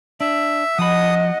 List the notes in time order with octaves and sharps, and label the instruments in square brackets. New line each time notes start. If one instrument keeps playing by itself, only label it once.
[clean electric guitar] D4 [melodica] E5
[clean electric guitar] F3 A5 B5 [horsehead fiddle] D#5 F#5 [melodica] D#6